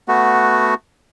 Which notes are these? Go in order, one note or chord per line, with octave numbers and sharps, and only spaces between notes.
A3 B3 F#4